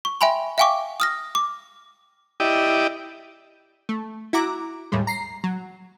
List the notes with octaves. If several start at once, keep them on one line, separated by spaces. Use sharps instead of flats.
C#6
E5 G5 G#5 B5 C6
E5 F5 G5 G#5 C#6 D6
D#6 F6 A#6
D6
E4 G4 D5 D#5
A3
E4 F#4 A#5 D6
D#2 A2 G3 G#3
A#5 C7
F#3